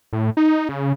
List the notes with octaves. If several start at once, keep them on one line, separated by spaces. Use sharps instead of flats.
A2
D#4
C#3